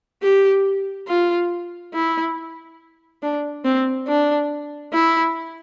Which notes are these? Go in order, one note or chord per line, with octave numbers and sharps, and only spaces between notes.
G4
F4
E4
D4
C4
D4
E4